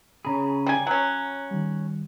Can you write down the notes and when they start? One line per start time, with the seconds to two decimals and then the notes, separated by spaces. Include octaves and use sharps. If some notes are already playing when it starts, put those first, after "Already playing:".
0.25 C#3 G#4 C#5 A#5 B5
0.66 G3 G#5
0.87 F#3 C#4 F#5
1.51 D#3 G3